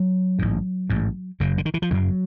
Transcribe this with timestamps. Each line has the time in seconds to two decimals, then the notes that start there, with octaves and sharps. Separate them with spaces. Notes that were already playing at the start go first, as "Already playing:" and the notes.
Already playing: F#3
0.39 A1 G#2
0.90 A1 G#2
1.40 F#1 F#2 C#3
1.58 D3
1.65 D#3
1.74 E3
1.82 F3
1.91 F#1 F#2 C#3 F#3